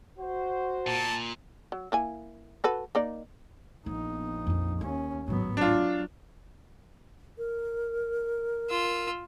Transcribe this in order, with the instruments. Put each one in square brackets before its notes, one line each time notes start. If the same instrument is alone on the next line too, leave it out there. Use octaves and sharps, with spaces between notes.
[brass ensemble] F#4 C5
[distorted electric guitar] A#2 [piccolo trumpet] A5
[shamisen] F#3
A#3 E4 G#5
F#4 A4 B4
A#3 D#4 D5
[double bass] A#1 D#4 [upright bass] B3
[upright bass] F2 F3
[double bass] D#2 C#4 [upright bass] A#3
[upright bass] G#1 A2 [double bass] F#3 B3
[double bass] F#3 [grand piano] D4 F4
[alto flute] A#4
[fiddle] F4 E6